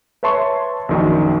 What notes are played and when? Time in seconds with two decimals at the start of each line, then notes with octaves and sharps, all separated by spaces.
0.23 B4 C#5 E5 A5 C6 C#6
0.89 A#1 F#2 D#3 F#4